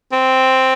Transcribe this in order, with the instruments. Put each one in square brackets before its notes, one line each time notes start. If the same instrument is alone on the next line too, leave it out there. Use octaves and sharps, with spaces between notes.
[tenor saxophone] C4